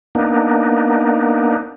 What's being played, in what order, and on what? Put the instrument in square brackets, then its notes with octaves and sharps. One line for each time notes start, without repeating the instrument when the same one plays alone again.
[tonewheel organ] A#3 B3 D4 D#4